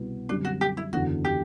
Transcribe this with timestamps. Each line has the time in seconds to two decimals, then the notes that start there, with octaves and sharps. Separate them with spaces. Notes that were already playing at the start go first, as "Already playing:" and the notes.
Already playing: C2 B2 G3 B3 E4
0.29 F#2 D3 G3 C4 D4
0.45 F#4
0.61 G4
0.77 E4
0.92 F#1 E2 D3 F#3 F#4
1.25 G4